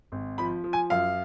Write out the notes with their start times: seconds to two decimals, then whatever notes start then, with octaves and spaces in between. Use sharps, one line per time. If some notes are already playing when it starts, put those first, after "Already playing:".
0.12 G#1
0.38 F3 B5
0.64 F3
0.73 G#5
0.90 F#2 F5